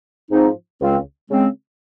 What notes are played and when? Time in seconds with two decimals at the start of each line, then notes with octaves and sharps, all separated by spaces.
0.30 G#2 F3 C4 D#4
0.80 C#2 C#3 G#3 C4 F4
1.30 C#3 G#3 C4